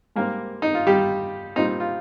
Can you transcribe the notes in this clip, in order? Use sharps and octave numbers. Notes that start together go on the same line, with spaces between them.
G#2 G3 A#3 C4 A#4
D#4
F4
G3 G4
A#2 G3 C4 D#4
F4